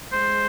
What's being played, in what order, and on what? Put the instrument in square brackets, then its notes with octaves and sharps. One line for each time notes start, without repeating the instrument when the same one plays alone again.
[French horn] G#3 [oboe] C5